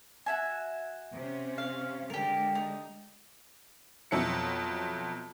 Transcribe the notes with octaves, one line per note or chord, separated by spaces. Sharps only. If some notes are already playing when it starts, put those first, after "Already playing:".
F#4 E5 G#5
C3 C#4
F5
D3 G#3 G4 A#4
D#4
F2 B2 F#3 E4 C#7